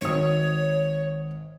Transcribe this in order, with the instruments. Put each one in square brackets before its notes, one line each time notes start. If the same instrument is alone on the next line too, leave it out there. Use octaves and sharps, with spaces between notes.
[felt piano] G#1 D#6 [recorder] C#5